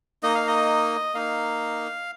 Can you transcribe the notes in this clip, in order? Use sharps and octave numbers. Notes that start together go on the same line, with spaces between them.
A#3 D#4 D#5
F5
D#5
A#3 D#4 F5